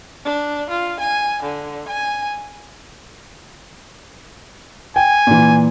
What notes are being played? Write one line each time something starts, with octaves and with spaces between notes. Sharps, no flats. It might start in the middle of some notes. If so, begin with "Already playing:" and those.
D4
F4
G#5
D3
G#5
G5 G#5
A#2 E3